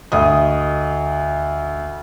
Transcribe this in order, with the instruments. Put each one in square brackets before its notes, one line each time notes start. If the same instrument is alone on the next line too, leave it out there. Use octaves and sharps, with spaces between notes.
[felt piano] D2 D#5 D#6